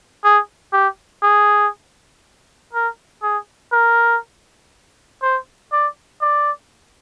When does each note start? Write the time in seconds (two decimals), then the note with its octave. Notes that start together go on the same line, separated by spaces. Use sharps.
0.24 G#4
0.73 G4
1.23 G#4
2.73 A#4
3.23 G#4
3.72 A#4
5.22 C5
5.73 D5
6.22 D5